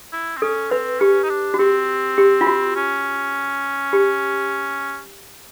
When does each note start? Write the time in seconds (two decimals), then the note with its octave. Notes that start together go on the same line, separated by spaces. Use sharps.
0.13 E4
0.37 C4
0.42 C#4 A4
0.71 C4 B4
1.01 C#4 G4
1.23 D#4
1.29 D4
1.54 F#4
1.59 C4 G4
2.18 G4
2.41 F4
2.47 F#4
2.76 C#4
3.93 G4